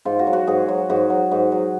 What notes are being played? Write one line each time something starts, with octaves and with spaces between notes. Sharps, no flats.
G#2 F4
F#4
F#3
F#4
G#2 G#4
F#3
G#2 F#4
F#3
G#2
F#3